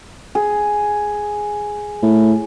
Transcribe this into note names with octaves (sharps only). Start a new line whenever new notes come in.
G#4
A2